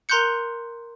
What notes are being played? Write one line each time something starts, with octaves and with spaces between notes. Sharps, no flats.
A#4 A#5 C6 F#6 G6 C#7